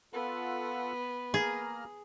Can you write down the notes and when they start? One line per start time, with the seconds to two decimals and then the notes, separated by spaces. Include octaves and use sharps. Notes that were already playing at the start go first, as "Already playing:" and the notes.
0.13 B3 F4 A4 F#5
1.34 A#3 G#4 A#5 F6